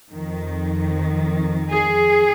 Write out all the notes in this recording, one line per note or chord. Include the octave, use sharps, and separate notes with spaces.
F2 D#3
G#4